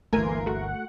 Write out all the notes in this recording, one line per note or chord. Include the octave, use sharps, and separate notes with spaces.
G1 D2 E3 A3 A#3 A#4 G#5 C6
A3 F#4 F#5